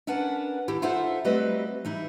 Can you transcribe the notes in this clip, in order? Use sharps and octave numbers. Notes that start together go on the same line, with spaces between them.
C#4 D4 A#4 B4 F#5 A5
D#2 E4 G4
D#4 F4 A4 C5 E5 F#5
F#3 G3 A3 C4 B4 D#5
E3 D#4 E4